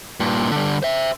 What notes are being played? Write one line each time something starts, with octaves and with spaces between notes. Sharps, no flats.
G2 A#2
D3 G3
C5 E5